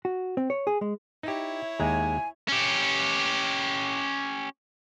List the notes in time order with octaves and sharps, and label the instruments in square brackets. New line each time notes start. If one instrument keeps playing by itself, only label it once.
[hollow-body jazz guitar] F#4
C4
C#5
G#4
G#3
[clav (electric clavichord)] D#4 G4 [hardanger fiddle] E4 C#5
[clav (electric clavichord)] D#2 G#3 A#5 [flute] G#5
[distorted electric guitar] C#4 G4